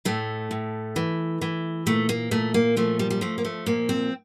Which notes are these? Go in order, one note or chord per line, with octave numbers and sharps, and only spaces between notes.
A2 A3
A2
E3
E3
A#2 A3
A#3
A#2 A3
A#3
F3 A3
G3
G3
F3 A3
A#3
A3
A#2 A#3
C4